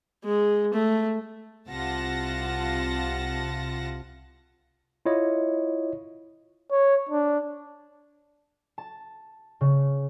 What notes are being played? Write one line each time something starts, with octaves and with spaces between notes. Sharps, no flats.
G#3
A3
C2 C3 F4 F#5 A5 A#6
E4 F4 C#5 D#5
C#5
D4
A5
C#3